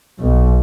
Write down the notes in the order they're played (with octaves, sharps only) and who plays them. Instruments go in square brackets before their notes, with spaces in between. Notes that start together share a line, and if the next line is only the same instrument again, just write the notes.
[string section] B1